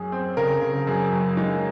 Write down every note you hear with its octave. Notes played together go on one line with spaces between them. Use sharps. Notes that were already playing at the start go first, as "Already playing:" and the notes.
Already playing: F#2 G#4
C4
C#3 A#4
C#3
F#2 G#4
F#2
G#3 D#4